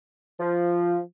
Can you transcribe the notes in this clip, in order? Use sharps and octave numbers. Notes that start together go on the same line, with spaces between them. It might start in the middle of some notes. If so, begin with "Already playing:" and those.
F3